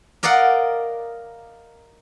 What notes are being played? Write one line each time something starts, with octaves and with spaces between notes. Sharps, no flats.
A#4 D5 D#5 F5 F#5